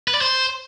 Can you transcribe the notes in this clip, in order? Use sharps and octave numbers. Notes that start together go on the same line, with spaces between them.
B4
D5
C5